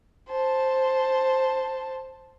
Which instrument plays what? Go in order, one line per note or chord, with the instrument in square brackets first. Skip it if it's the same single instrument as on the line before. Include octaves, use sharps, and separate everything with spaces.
[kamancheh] C5 A5